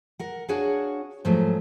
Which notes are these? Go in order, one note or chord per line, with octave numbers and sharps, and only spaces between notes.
A#4 F#5
D4 F#4 G#4 C#5 F5 F#5
G#2 F3 F#3 A3